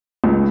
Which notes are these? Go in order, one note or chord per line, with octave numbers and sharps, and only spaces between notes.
C#2